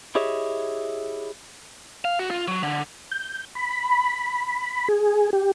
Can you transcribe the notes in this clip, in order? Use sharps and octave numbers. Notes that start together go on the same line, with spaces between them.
E4 G4 G#4 C#5 D#5 E5
F5
F#4
F4
F#3
D3
G6
B5
G#4
G4